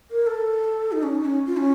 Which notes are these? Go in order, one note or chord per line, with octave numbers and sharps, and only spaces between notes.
A#4
A4
D#4
C#4
D#4
C#4
F4
C#4